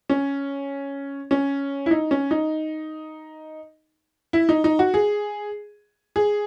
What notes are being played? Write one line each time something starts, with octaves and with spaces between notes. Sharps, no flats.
C#4
C#4
E4
D#4
C#4
D#4
E4
D#4
D#4
F#4
G#4
G#4